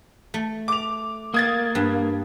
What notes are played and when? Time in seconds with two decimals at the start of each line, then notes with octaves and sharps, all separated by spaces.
0.34 A3
0.68 D6 F7
1.34 A#3 D#6 G#6 A6
1.75 G2